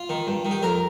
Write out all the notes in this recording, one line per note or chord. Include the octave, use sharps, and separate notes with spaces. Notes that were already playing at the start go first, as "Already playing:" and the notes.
Already playing: F4
D#3
G2
D#3
G4
F2 A#4